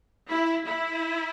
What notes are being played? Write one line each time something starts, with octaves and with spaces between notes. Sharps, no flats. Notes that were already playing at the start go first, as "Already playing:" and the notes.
E4
E4